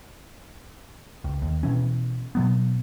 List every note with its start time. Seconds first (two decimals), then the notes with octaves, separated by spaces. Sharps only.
1.24 C#2
1.42 D#2
1.63 B2 E3 C#4
2.35 B2 F#3 B3